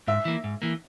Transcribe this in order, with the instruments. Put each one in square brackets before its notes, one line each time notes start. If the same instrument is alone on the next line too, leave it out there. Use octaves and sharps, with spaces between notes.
[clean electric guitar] G#2 [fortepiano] E5
[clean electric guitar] E3 A#3
G#2
E3 A#3